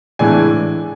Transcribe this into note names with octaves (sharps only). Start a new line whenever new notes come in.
A2 E3 G#3 D4 G#5